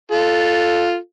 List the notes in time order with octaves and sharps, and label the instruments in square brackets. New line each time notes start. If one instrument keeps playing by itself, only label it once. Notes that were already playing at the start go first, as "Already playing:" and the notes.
[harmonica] F4 A4